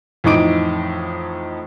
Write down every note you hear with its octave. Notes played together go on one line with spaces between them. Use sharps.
F2 A2 E3 D#4 D6 D7